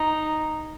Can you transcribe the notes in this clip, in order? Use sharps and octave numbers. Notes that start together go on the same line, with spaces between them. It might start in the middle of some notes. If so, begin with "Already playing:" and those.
Already playing: D#4